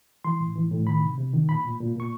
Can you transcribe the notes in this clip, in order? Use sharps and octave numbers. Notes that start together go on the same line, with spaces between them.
E3 C6
A2
E3
A2
D#3 B5
C3
C3
D#3
A#2 B5
A#2
A#2
A#2 C#6